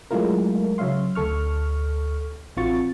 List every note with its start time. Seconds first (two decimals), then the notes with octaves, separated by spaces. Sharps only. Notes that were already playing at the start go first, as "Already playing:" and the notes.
0.11 F#3 G#3 A3 E4 F4 A#4
0.78 C#3 F#3 C#5 E5 F5 C6
1.15 D2 A4 C#6 F6
2.57 A1 C4 F4 F#4 C#6 A6